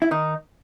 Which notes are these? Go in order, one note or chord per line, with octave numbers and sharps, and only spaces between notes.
E4
D#3 D#4